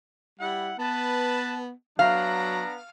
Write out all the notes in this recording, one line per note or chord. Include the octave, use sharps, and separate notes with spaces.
G3 E4 F#5
B3 B4 A5
F#3 B3 D4 F5 A#5